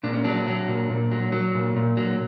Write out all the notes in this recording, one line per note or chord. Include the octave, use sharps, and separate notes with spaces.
A#2 D4
C#4
F#3 D4
F#3
A#2
A#2
F#3
F#3
A#2
A#2
F#3